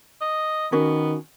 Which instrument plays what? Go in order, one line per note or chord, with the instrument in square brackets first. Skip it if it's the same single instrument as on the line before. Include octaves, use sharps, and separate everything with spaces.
[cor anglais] D#5
[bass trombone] D#3 [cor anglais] B3 [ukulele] C#4 F#4 A#4